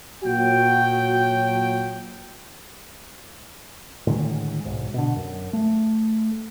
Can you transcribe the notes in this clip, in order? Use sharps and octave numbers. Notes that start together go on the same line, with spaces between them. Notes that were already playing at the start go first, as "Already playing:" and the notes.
A#2 F#3 F#4 G5
A2 D3 D#3 G#3
B1 G#2
B2 D3
F#2
A3